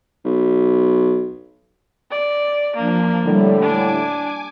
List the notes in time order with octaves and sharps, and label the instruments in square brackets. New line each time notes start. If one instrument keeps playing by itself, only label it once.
[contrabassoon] B1
[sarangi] D5
[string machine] F3 D4 [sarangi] A#3
[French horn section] A2 D3 [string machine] G3
[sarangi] D4 [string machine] G#5 D6